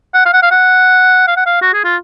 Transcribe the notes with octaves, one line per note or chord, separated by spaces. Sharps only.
F#5
F5
F#5
F5
F#5
F5
F#5
F5
F#4
G#4
F4